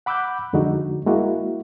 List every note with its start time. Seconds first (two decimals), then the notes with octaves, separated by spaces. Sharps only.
0.06 F#5 B5 D6 E6 F#6 G6
0.53 F2 D3 G#3 D#4 F#4
1.07 G#3 A#3 E4 F#4